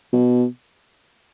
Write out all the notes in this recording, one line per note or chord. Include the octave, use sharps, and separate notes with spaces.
B2